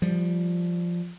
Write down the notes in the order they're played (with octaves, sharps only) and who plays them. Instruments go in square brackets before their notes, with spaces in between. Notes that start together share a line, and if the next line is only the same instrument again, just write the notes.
[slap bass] F3 G3